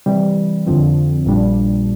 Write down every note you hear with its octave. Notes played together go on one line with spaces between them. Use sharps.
C3 E3 G3
F2 D3 F3 C4
A#1 A#2 G3 D4